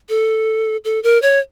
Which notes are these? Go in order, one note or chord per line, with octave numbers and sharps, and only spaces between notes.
A4
A4
A#4
C#5